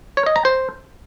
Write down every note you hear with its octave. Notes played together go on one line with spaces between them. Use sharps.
C#5
D#5
A#5
C5